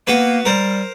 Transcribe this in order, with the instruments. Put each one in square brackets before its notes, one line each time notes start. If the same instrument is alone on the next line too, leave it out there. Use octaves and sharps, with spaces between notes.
[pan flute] A#3 [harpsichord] B3 F#4 B4
[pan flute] G3 [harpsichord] A#4 C5